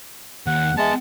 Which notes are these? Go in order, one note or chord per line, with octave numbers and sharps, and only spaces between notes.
D#2 F#5
G#3 B3 E5 A5